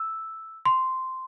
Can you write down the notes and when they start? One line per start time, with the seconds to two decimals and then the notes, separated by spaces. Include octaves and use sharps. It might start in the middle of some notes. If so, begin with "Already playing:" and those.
Already playing: E6
0.65 C6